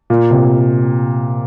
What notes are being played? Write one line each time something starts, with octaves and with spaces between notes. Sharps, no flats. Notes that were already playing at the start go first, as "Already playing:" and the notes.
A#2
C3